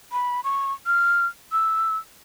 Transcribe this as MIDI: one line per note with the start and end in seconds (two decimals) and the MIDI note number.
0.12 0.41 83
0.44 0.73 85
0.86 1.26 89
1.52 1.97 88